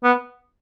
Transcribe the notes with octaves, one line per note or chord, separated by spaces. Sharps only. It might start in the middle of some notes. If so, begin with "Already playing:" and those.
B3